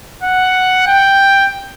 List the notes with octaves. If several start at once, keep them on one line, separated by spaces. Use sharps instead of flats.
F#5
G5